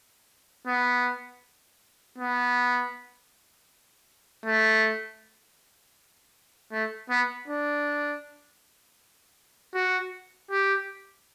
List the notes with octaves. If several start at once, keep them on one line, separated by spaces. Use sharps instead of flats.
B3
B3
A3
A3
B3
D4
F#4
G4